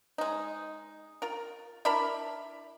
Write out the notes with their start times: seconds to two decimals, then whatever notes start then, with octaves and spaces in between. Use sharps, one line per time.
0.18 G#3 D#4
1.22 F4 A#4
1.85 D4 E4 A#4 B5